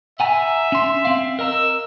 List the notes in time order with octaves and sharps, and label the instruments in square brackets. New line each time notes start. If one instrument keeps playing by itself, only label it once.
[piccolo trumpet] E5 [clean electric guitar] F#5 G#5 A#5
[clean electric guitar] C#4 C6
C4 F5
[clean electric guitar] A#4 D#5 A#5 [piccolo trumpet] E6